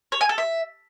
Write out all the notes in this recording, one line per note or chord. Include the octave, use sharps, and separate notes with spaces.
C#5
G#5
A4
E5